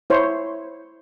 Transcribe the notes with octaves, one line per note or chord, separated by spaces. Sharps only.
E4 C5 C#5